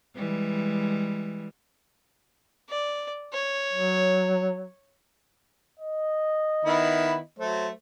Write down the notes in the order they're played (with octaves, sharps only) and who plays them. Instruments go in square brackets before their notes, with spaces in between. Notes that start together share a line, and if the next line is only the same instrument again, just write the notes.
[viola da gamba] E3 G3 G#3
[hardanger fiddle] D5
C#5
[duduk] F#3
[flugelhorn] D#5
[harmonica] D#3 B3 E4
[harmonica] F#3 A3 [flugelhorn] C5